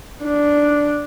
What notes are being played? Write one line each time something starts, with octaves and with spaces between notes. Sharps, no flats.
D4